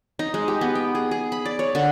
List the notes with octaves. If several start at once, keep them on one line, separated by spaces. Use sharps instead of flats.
D#4
G#3
G4
B3
G5
G#4
G#4
B5
D5
C#5
D3